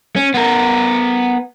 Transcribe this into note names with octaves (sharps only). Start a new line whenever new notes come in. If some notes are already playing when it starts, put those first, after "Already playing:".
C#4
B3 A#4